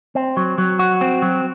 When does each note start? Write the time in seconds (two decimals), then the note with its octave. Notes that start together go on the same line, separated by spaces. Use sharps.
0.15 C4
0.37 F#3
0.58 F#3
0.79 F#4
1.01 C4
1.22 F#3